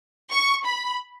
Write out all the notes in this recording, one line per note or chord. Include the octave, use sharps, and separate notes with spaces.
C#6
B5